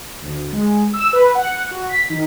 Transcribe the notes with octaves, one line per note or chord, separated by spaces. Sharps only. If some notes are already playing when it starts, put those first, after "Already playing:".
D2
G#3
E6
B4
F#5
F#4
B6
D#3